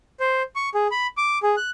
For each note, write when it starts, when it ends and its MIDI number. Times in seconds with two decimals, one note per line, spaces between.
0.20 0.42 72
0.56 0.69 85
0.74 0.88 68
0.91 1.07 83
1.17 1.38 86
1.43 1.56 68
1.57 1.70 90